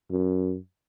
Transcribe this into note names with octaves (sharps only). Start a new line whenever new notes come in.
F#2